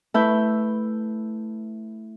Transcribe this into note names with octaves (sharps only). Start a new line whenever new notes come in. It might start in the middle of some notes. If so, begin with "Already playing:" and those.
A3 E4 B4 G6